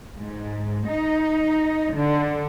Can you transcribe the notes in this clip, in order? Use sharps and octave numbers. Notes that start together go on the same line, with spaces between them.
G#2
D#4
D3